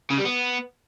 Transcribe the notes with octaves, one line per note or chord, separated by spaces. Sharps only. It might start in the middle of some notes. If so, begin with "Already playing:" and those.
C#3
G3
B3